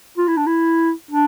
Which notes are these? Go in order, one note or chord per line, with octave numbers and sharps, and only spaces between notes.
F4
E4
D4
E4
D4